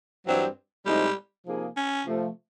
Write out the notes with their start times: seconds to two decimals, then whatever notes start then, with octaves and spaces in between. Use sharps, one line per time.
0.26 G2 E3 F#3 G3 C4
0.86 A2 F3 G3 G#3 C4 D#4
1.46 C3 F3 A#3 D#4 G#4
1.77 C#4
2.06 C3 F3 A3